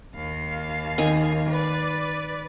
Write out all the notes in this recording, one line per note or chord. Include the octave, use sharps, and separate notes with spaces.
D#2 F5
D#3 G#5
B4 D5